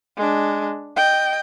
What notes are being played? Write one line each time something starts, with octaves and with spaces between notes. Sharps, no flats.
G#3 D4
D#5 G5